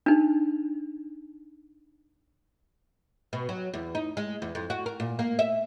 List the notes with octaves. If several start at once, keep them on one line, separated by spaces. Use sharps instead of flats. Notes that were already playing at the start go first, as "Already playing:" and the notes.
D4 D#4
B2
F#3
E2
D#4
G#3
E2
F2
F#4
A#4
A#2
A#3
E5